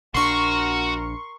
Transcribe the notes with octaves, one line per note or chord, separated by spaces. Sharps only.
A#1 D4 F#4 A#4 C6 C#6